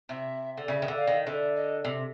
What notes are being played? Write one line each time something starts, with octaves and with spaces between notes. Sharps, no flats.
C3 E5
D3
C#3 E5
D#3
D3
F5
D#3
D3 E5
D#5
C3